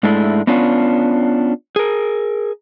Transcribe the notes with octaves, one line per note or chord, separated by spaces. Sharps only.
G#2 G#3 A3 D4 E4
B3 C#4 D4 F4
G#4 A#4